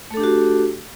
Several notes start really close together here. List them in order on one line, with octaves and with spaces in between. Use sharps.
A3 A4 D4 G4 F#4